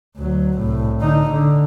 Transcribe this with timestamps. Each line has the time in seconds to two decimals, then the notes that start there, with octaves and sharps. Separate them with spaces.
0.16 D2 F#3
0.58 C2 A2
1.00 D3 D#4
1.30 D3